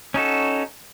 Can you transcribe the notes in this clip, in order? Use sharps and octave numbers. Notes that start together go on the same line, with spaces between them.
C#4 D#4 F#4 A4